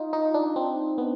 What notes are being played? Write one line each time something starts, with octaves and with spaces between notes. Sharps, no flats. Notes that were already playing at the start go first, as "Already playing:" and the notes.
Already playing: D#4 F4
D#4
D4
C4
B3